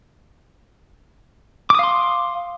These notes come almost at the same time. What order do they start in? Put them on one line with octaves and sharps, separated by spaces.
D6 D#6 F5 C6